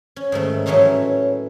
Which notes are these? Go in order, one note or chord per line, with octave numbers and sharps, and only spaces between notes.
C#4
G#2 D#3 A3
A2 E3 F#3 C#4 D#4 C5